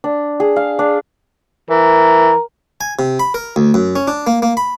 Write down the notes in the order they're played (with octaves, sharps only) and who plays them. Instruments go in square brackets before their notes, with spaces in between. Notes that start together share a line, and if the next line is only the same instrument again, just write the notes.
[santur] D4
G#4
F5
D4
[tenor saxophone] E3 [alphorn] A#4
[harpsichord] G#5
C3
B5
A#4
D2
F#2
C#4
D4
A#3
A#3
B5